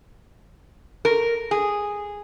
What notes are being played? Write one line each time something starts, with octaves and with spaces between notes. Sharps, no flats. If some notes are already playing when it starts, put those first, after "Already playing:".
A#4
G#4